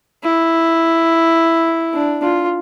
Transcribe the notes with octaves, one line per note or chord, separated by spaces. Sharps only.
E4
D4
F4